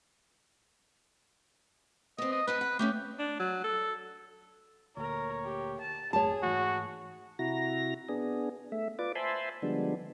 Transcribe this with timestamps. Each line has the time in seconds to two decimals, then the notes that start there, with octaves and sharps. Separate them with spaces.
2.18 B3 C4 D#5
2.32 D#5
2.47 B3 D#4 B4 A5
2.61 F#5
2.79 A3 B3 C#4 G4
3.19 D4
3.40 F#3
3.64 A4
4.97 D2 A#2 A#4 C#5
5.45 G4
5.81 A5
6.13 G#1 F2 A3 G#4 C#5 A5
6.42 G#2 E3 A3 F#4
7.39 C3 E4 F#4 A#5 A#6
8.09 B3 D4 G#4
8.72 A3 E5
8.99 F4 B4 D5 D6
9.15 C5 E5 G#5 A5 B5 C6
9.62 D3 F3 G3 G#3 B3 D4